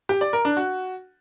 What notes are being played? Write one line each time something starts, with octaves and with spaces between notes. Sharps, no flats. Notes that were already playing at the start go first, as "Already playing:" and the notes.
G4
D5
A#4
D4
F#4